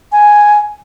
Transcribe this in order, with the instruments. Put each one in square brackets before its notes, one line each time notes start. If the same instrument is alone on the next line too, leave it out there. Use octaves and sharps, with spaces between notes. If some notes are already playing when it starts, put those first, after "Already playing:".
[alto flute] G#5